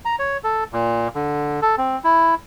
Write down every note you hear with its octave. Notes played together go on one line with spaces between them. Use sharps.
A#5
C#5
A4
A#2
D3
A4
C4
E4